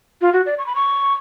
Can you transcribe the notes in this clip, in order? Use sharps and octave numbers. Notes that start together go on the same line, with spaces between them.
F4
F#4
D5
C#6
B5
C#6